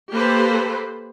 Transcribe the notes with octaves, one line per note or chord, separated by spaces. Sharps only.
A#3 G4 A4 B4 C5